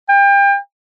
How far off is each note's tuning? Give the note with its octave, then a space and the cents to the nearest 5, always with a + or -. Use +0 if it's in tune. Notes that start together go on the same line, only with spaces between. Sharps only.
G5 +30